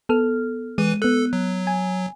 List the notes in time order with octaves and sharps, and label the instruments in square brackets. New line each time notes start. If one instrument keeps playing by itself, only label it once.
[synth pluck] B3 A4 F6
[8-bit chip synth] E3 B4 [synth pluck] G#3 D#7
[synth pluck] B3 F#6 [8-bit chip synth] A4
[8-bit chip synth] F#3
[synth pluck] G#5